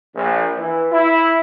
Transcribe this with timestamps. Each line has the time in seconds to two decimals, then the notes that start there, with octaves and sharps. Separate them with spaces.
0.15 A#1
0.57 E3
0.92 E4